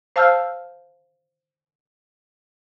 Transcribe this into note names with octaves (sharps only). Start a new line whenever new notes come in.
C5 F5 A5 E6 F6 G6